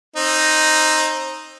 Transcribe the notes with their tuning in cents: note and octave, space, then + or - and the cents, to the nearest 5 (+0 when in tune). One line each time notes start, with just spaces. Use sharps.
C4 +30 D#4 +0